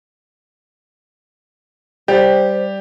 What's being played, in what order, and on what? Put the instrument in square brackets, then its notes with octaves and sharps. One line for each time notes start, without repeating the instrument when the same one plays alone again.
[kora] G3 [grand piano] G4 [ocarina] C5